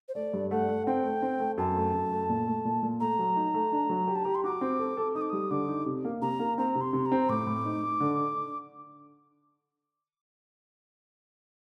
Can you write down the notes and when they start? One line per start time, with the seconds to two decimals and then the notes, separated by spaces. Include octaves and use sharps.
0.08 C5
0.15 A3 D5
0.33 G2
0.51 A3 F#5
0.68 A3
0.87 C4 G5
1.04 A3
1.22 C4
1.40 A3
1.58 F#2 A5
1.76 A3
1.94 F#2
2.11 A3
2.29 A#2
2.47 A3
2.65 A#2
2.83 A#2
3.00 A3 A#5
3.19 F#3
3.36 D#4
3.54 A3
3.72 D4
3.89 F#3
4.07 G4
4.15 A5
4.24 G4 A#5
4.35 C6
4.44 F#4 D6
4.61 C4
4.79 A4
4.97 A4
5.15 D#4 D#6
5.21 D6
5.30 G3 D#6
5.51 D3 D6
5.68 D#4
5.86 C3
6.05 A#3
6.22 C3 A#5
6.39 A#3
6.58 C4 A#5
6.75 C3
6.81 C6
6.93 C3
7.06 A#5
7.12 C4
7.29 A2 D6
7.47 A2
7.65 D#4
7.83 D#4
8.00 D3